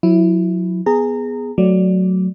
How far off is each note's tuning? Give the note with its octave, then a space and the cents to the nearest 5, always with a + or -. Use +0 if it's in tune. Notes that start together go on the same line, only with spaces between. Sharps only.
F#3 -30 E4 +0
B3 +0 G#4 +0 A#5 -25
F#3 +0 A3 +0 D5 +0